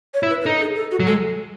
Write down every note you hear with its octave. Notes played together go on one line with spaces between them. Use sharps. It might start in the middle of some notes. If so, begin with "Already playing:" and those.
C#5
E4
B4
B4
D#4 A4
G#4
A4
F#4
F#3
G#3 A4